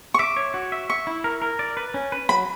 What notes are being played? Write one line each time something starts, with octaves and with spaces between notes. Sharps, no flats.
C#6
E5 D6
C#5
F#4
E5
E5 C#6
E4
A#4
A#4
D5
B4
C#4
B4
F#3 B5